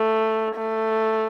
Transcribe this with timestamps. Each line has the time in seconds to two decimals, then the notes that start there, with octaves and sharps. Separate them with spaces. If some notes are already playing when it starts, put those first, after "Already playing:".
Already playing: A3
0.55 A3